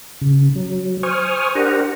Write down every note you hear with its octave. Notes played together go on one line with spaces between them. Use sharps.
C#3
F#3
C5 G#5 C#6 D#6 F6
D4 G4 A#4 C5 F#5 A#5